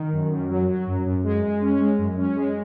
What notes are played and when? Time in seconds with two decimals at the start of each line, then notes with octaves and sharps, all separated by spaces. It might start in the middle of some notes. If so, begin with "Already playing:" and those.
Already playing: D#3
0.13 F#2
0.31 F#2
0.49 F#3
0.68 F#3
0.87 F#2
1.06 F#2
1.24 G#3
1.43 G#3
1.61 C#4
1.80 G#3
1.98 F#2
2.17 C#4
2.36 G#3